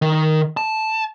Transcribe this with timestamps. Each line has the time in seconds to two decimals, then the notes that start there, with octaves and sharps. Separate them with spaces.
0.02 D#3
0.57 A5